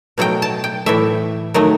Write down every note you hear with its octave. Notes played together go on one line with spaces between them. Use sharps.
B2 F#3 A3 G5
A5
G5
A2 E3 A3 E5
D#3 F#3 A3